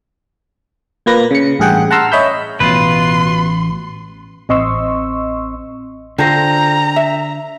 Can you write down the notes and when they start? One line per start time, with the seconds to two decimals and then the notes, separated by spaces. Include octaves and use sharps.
1.06 A#2 A#3 B4 A#6
1.31 C#3 C#7
1.59 A1 G2 G#4 F#5 G5
1.91 F#5 A5 A#5 C6 E6 F6
2.12 C#5 D#5 E5 B5 E6 G6
2.60 A1 B2 F4 B4 C6
4.49 A1 C4 D#5 C6 C#6 E6
6.18 D3 F4 A4 C5 G5 A#5 G6 A#6
6.96 E5